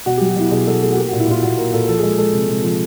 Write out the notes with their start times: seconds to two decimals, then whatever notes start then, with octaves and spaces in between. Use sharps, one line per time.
0.06 B2 F#4
0.17 G4
0.21 F#3
0.29 F#4
0.36 B2 E4
0.51 B2 G#4
0.67 B2 A4
0.82 A3 G#4
0.92 F#4
0.97 A#3 G4
1.08 F#4
1.13 A#2
1.20 E4
1.27 A#2 F4
1.42 A#2 F#4
1.58 A#3 A#4
1.73 A#2 A4
1.88 F3 A4
1.99 G#4
2.03 G#3 A4
2.18 G#3 A4
2.33 C3
2.48 C3
2.64 F3